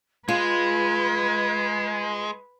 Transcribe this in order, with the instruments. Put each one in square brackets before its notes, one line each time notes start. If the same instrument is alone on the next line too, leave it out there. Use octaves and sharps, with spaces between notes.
[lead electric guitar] G#3 [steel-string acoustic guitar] F4 [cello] B4 [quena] G#6